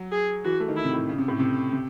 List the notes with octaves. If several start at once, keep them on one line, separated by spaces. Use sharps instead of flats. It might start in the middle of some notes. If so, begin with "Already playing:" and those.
Already playing: F#3
G#4
E3 F#4
A3
D#3
E4
C3
A2
C#3
C3
A2
C3
C3